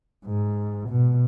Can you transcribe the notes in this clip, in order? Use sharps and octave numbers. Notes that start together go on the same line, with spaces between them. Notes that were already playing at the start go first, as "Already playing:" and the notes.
G#2
B2